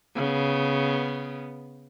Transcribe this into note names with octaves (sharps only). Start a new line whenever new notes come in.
C#3 B3